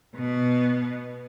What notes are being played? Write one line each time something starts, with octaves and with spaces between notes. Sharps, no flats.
B2 B3